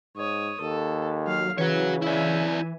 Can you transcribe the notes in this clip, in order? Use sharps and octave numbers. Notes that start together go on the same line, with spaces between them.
G#2 C#5 D#6
D#2 A4
F#3 F5
C#3 E3 F#4 B4 C#5
E4 D5 E5 G#5